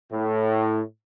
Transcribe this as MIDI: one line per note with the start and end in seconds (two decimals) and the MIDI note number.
0.11 0.80 45